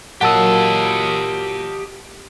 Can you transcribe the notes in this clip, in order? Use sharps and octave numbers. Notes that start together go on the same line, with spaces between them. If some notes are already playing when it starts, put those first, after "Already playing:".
A#2 F#3 A#3 G4 D#5 F#5 A5 E6